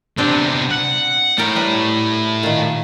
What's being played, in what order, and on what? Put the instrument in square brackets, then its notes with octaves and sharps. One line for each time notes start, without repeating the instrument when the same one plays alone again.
[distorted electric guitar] C3 B3 [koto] C4 D4 C5
[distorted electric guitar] F#5
[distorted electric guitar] A3 E4 [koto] A#4 G5 A5
[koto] G3 B4
A#2 D#3